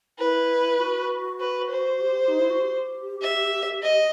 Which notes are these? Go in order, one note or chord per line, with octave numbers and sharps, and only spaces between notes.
E4 B4
F#4
B4
C5
G4
D#4
E4
F#4
G4
E5
D#5